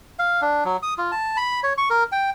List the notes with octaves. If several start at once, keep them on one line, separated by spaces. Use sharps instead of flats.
F5
D4
F#3
D#6
F4
A5
B5
C#5
C#6
A#4
G5